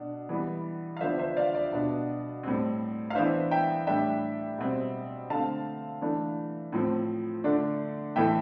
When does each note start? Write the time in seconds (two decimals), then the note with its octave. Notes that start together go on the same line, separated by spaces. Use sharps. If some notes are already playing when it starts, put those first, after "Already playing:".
Already playing: B2 D4
0.29 E3 G3 B3
0.97 F5
1.01 D3 F3 B3 D4 C5 E5
1.19 C5 E5
1.37 D5 F5
1.55 D5
1.72 B2 B3 D4
2.43 A2 G3 C4
3.10 F5
3.15 E3 B3 D4 C5 E5
3.51 E5 G5
3.87 A2 G3 D4 E5 G5
4.58 B2 G3 C4
5.29 D3 A3 C4 F5 A5
6.02 E3 A3 D4
6.73 A2 F3 C4
7.44 D3 A3 D4
8.16 A2 E3 A3 E5 G5